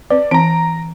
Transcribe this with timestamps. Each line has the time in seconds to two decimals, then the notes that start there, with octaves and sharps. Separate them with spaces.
0.10 C4 B4 D5
0.31 E3 C4 A#5 D7